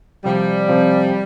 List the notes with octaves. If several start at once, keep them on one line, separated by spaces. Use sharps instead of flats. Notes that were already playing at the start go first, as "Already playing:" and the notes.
C3 F3 G3 C4
C3 F3 C4